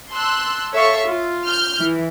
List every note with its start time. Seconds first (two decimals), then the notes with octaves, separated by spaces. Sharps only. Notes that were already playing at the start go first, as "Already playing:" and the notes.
0.10 A5 C6 E6 F#6
0.74 A4 C#5 E5 F5 C#6
1.08 F4
1.46 F6 G6
1.80 E3